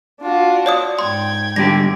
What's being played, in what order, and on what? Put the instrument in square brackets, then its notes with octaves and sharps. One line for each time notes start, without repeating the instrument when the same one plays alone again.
[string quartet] D4 F4 F#4
[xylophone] C#5 D5 D#6
[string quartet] G#2 G5 G#6 [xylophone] C6
[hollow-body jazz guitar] G2 D3 G4 [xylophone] A#6